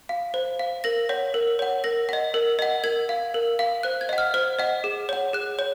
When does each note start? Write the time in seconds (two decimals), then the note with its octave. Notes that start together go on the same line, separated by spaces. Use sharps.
0.09 F5
0.34 C5
0.59 F5
0.84 A#4 A#6
1.09 C#5 F#5
1.34 A#4
1.59 C#5 F#5
1.84 A#4 A#6
2.09 D#5 F#5
2.34 A#4
2.59 D#5 F#5
2.84 A#4 G#6
3.09 F5
3.34 A#4
3.59 F5
3.83 C5 F#6
4.01 G#6
4.09 D#5 F#5
4.18 F6
4.34 C5 F6
4.59 D#5 F#5
4.84 G#4
5.09 C#5 F#5
5.33 G#4 F#6
5.59 C#5